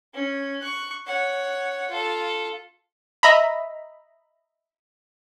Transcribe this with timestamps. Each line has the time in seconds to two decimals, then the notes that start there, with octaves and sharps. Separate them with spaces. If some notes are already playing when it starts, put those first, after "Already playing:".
0.14 C#4
0.61 C#6 F#6
1.06 C#5 F#5
1.90 F4 A4
3.23 D#5 E5 A#5 B5